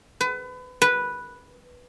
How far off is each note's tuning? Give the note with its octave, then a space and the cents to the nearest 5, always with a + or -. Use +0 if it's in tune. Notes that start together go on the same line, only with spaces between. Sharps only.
B4 +30
B4 -5